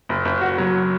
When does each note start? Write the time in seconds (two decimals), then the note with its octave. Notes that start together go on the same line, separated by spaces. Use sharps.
0.09 F#1
0.25 F#1
0.41 F#4
0.58 F#3